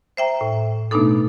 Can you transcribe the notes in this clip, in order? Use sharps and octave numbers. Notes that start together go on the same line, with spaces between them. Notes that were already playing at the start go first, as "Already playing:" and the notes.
C5 E5 G5 A#5
A2
B2 A3 B3 D4 D#4 A4